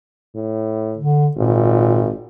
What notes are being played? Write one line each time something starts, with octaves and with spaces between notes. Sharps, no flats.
A2
D3
G#1 A#2